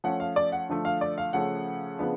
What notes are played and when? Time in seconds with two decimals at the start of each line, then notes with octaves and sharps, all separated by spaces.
0.04 F3 A3 C#4 F#5
0.20 F5
0.36 D5
0.52 F#5
0.69 D3 F3 A3
0.85 F5
1.01 D5
1.18 F5
1.33 C#3 F3 A3 C#4 F#5
1.99 C#3 F3 B3 D4